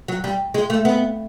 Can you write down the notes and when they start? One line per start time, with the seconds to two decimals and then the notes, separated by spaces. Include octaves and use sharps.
0.08 F#3
0.24 G3
0.54 G#3
0.70 A3
0.85 B3